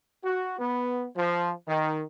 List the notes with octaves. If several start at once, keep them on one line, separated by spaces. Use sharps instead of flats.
F#4
B3
F3
D#3